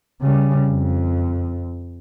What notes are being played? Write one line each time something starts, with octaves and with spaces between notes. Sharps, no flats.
C#3 G3
F2